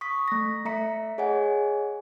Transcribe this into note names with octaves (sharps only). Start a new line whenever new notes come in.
C#6 D#6 B6
A3 A#6
A3 E5 A#5 B6 C#7
G#4 C#5 D#5 F#5 G#5